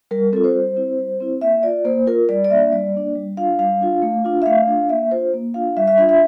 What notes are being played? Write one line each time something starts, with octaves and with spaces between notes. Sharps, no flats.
G3 A#4
C4 F4 A4
C5
G3
C4 E4
G3
C4 E4
A#3 E5
F4 D5
A#3 C5
F4 A#4
G3 D5
D5
A#3 D4 E5
G3 D5
A#3 D4
G3
D4 F4 F5
G3 F5
D4 F4
A3
D4 F4
E5
A3 F5
D4 F4
A#3 E5
D4 F4 C5
A#3
D4 F4 F5
G3 E5
E5
D4 F4 E5
E5